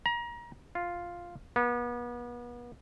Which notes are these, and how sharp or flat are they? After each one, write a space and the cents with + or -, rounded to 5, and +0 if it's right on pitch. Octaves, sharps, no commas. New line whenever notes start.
A#5 +30
F4 +0
B3 -35